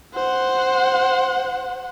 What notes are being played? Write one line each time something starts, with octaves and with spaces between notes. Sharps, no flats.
C5 F#5